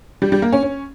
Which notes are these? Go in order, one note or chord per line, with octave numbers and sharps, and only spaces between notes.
G3
G3
A#3
C#4
C#4